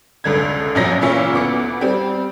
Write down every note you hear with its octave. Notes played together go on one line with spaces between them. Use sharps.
F1 C#2 D3 G#6
A#1 A#2 F3 F#3 A#6
A#2 C#3 E3 C#4 E4 F4
D2 B3 D6 C#7
G3 C4